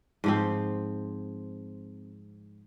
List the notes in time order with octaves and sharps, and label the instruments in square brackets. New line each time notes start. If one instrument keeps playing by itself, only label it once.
[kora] G#2 F3 C4